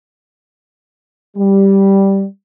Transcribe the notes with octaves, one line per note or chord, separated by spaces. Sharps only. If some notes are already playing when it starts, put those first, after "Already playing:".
G3